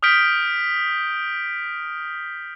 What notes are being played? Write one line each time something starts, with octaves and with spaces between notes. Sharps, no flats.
D#6 F6 G6 B6 D7 G7